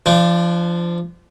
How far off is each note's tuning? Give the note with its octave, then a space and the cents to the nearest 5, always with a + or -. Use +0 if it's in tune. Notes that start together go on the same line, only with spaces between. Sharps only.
F3 -25 D4 +5